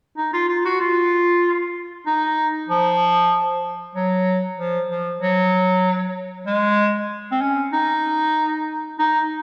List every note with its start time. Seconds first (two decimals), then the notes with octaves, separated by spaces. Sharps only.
0.17 D#4
0.33 F4
0.49 F4
0.65 F#4
0.80 F4
2.06 D#4
2.69 F3
3.95 F#3
4.58 F3
4.89 F3
5.21 F#3
6.47 G#3
7.31 C4
7.42 C#4
7.73 D#4
8.99 D#4